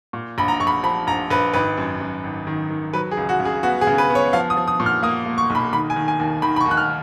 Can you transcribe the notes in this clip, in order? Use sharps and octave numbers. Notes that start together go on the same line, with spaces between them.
A#2
A#1 B5
A#5
A#1 C#6
B5
F3 B5
A#1 A#5
A#1 B4
G#1 B4
F#2
F#2
G#1
D#3
D#3
F#3 B4
G#4
C#2
F#4
C#3
G#4
B3 F#4
G#4
C#3
B4
B3
C#5
F3 F5
D#6
F3
D#6
A#2
F6
A#3 D#6
A#3
C#6
B1 B5
D#3 B5
G#5
D#3
G#5
D#2
D#3 B5
B5
C#6
D#2
F#6
F6